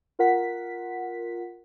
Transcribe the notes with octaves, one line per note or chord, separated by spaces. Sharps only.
F4 A#4 F#5 B6